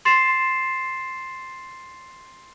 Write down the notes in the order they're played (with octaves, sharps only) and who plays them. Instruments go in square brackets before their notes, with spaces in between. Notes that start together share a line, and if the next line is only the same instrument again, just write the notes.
[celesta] C6 A6 C7 E7